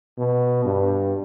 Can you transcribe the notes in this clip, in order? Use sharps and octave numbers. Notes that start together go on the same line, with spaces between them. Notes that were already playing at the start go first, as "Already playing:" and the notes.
B2
G2